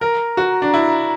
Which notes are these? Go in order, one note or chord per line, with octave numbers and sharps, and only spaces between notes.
A#4 A#5
F#4
D4
E4